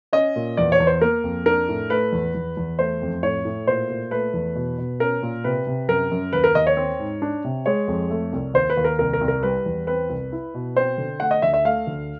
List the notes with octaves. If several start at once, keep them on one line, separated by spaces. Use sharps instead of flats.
C#4 D#5
A#2
E2 D5
C#5
E2
C5
A#3 A#4
F2
D4 A#4
A2
A3 B4
E2
E2
E2
A3 C5
F2
A2 C#5
A2
A#2 C5
A#2
A3 B4
E2
B2
B2
C#4 A#4
A#2
C3 B4
C3
F#2 A#4
F#2
D#2 B4
A#4
D#2 D#5
C#5
C4
G#2
D4
C3
G#3 C#5
F2
A3
C2
D#2 C5
B4
D#2
A#4
C2 A#4
A#4
C2
A#4
G3 B4
E2
C4 B4
C2
E4
B2
C4 C5
D3
A3 F#5
D#5
D2 E5
E5
A3 F5
D2